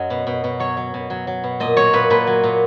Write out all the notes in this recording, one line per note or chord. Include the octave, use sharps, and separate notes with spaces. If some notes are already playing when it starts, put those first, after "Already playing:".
Already playing: F#2 F#3 D#5
B2
B2
B2
F#3 C#5
F#3
B2
F#3
F#3
B2
A#2 D#5
F#3 C#5
A#2 B4
A#2 B4
F#3
A#2